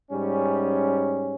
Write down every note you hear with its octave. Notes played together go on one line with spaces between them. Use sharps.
G#2 G3 C#4